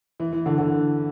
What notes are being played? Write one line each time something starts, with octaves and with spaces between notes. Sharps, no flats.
E3
E3
D3
D3